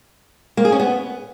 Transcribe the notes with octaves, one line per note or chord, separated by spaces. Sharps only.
A#3
G#4
C#4
B3